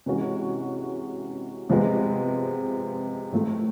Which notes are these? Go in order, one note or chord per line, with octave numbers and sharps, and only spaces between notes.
C3 E3 G#3 C#4 F#4
C3 F3 G#3 B3
A2 F3 A3